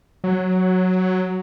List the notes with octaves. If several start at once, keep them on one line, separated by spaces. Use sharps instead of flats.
F#3